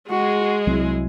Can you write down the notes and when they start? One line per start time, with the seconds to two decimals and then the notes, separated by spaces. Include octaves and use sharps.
0.10 G#3 F#4 G#4
0.67 C2 F#3 C4 E4